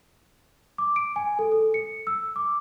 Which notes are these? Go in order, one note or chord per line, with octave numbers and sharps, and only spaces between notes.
D6
D7
G#5
A4
A4
C#7
E6
D6